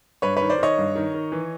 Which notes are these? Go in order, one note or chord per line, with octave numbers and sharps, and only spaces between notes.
G2 B4 C#5
D#3 B4 C#5
C5 D5
D#3 C#5 D#5
G2
D#3
D#3
E3